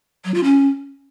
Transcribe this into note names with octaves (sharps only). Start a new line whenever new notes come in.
F#3
F4
C#4